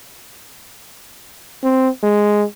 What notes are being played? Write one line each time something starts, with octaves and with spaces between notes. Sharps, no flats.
C4
G#3